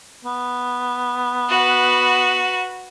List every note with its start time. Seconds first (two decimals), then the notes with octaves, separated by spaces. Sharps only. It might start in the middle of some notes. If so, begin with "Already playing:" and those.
0.25 B3
1.49 F#4 B4